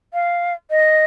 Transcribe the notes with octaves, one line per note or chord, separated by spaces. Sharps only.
F5
D#5